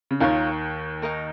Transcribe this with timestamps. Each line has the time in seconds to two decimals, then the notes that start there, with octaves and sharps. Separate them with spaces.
0.11 C#3
0.20 D#2 D#3 F4 A#4 C#5
1.02 D#4 A#4 D#5